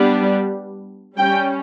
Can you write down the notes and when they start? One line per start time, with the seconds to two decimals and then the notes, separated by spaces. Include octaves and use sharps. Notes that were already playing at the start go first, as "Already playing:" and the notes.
Already playing: G3 B3 D4
1.17 G3 C#4 G5